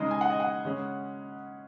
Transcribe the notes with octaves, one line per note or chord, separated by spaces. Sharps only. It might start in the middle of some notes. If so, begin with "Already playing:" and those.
Already playing: C#3 G#3 D#4 D#5
G#5
F#5
D#5
F#5
C#3 G#3 C#4